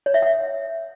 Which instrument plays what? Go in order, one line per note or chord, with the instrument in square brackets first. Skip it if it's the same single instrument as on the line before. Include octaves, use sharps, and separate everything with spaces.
[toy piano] C#5
E5
F#5